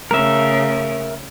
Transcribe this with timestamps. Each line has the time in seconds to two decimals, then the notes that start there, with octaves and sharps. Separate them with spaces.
0.11 C#3 A3 A#4 E5